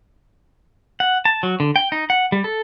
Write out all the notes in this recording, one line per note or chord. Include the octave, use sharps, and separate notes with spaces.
F#5
A5
F#3
D3
G5
D#4
F#5
G3
A4